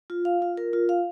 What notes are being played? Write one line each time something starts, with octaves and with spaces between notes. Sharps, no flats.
F4
F5
F4
A#4
F4
F5